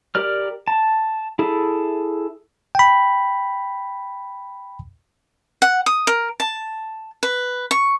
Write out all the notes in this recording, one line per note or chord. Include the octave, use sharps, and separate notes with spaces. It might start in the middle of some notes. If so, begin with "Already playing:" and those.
G4 A#4 D5 F6
A5
E4 G#4 A4
G5 B5
F#5
D#6
A#4
A5
B4
C#6